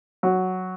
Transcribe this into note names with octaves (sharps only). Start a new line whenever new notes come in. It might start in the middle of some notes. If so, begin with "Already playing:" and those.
F#3